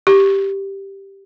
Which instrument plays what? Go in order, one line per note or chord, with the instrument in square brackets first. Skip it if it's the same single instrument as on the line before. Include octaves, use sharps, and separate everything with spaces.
[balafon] G4